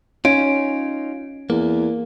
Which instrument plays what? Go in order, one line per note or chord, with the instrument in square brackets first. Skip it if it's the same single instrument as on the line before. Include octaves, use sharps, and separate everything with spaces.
[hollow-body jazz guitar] C#4 [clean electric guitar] D#4 F4 [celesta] D7
[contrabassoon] E2 [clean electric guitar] A#3